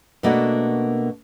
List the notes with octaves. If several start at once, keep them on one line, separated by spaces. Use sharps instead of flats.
B2 A3 A#3 D4 F#4